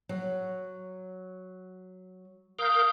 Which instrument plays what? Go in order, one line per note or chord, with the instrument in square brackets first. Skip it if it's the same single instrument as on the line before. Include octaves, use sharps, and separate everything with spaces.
[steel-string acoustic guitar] F#3
[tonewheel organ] A#4 F5 G6 [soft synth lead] D#6